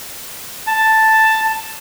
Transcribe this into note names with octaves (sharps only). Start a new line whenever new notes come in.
A5